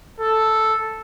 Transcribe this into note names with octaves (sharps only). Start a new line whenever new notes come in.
A4